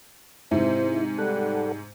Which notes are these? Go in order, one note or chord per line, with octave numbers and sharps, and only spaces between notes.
G#2 C3 E4 C5
G3 A4 F#5